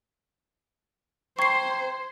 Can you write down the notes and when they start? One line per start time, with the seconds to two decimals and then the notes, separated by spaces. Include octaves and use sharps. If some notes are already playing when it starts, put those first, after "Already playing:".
1.39 C5 G5 A#5 C6 C#6 G#6 C7